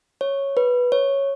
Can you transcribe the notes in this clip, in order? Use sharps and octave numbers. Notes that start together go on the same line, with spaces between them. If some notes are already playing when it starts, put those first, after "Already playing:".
C#5
B4
C#5